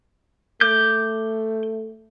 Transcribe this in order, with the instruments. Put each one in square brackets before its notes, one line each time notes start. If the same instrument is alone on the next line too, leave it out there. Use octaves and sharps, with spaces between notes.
[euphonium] A3 [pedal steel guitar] D6 G6